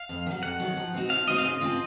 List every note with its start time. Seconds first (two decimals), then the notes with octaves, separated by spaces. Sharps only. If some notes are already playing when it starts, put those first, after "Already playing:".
Already playing: F5
0.09 F2
0.26 D#3
0.31 F#3
0.43 F2 F#5
0.60 D#3 F#3
0.77 F3
0.94 C4 D#4 F#4
1.10 F3 F5
1.27 C4 D#4 F#4 D#5
1.38 F5
1.45 C#3 D#5
1.61 F3 C4 F4